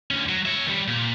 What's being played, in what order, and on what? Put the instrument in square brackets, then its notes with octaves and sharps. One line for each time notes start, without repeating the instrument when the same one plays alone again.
[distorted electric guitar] D2 C#4
F#3
C#5 E5
D#3 G3
A#2